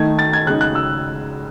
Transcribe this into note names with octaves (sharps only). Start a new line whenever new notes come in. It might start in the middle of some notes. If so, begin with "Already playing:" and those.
Already playing: D#3 A3 D#4 G#6
A6
G#6
C#3 G#3 D#4 F#6
F#6
E6